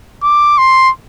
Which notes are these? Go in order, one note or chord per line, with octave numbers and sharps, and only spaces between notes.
D6
C6